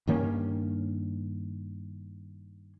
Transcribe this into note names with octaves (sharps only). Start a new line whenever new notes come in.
G2 D#3 A#3 C#4